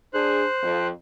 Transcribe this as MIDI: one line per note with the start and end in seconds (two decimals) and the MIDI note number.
0.14 0.45 62
0.14 0.45 68
0.14 0.87 72
0.14 0.87 90
0.63 0.90 41